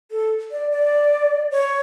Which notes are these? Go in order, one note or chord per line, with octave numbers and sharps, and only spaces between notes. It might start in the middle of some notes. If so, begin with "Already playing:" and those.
A4
D5
D5
C#5